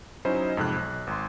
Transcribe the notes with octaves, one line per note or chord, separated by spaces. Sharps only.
F#3 C#4 D#4 E4 C5 D#5
F2 G#2 C3 F#6
B1
G#1 C6